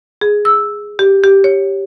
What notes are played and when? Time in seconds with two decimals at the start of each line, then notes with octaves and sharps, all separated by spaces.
0.21 G#4
0.45 E6
0.99 G4
1.24 G4
1.44 C#5